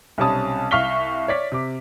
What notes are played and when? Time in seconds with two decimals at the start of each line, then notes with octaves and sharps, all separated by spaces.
0.18 B1 C3 G3 C#4 A5 D#6
0.71 C2 F5 C#6 F6 B6 G7
1.28 C#5 D5 B6
1.52 C3 D6